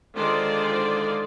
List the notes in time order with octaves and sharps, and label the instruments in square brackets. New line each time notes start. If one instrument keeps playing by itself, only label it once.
[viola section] D3 D#3 G#3 F4 C5 D5